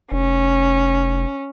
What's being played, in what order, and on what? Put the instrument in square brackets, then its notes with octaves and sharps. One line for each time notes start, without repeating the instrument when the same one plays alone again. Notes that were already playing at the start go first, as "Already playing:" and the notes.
[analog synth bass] F1 [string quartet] C#4